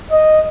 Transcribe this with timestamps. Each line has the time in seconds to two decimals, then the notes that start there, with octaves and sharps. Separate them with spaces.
0.11 D#5